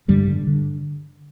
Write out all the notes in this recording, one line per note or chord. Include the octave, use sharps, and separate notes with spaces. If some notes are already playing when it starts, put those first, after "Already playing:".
G2 D3 G3
D3
D3